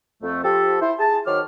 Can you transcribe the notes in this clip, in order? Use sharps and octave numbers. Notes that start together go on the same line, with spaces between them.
F2 A3
F3 G4 A4
E4 C5
G#4 A5
D#3 F#3 C5 C#5 D6 F6